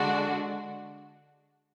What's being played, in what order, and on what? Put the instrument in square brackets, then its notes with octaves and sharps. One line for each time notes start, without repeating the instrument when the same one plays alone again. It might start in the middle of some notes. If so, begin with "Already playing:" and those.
Already playing: [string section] D3 G#3 D4 F#4